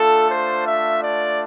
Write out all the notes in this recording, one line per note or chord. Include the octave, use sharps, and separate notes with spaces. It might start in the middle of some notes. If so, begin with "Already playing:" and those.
Already playing: A3 D4 F4 A4
C5
E5
D5